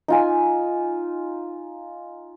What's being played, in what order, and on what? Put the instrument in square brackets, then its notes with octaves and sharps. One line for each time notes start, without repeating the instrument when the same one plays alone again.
[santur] D#4 F4 G#5